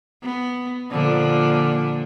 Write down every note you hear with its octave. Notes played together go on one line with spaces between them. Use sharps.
B3
A#2 D3 F3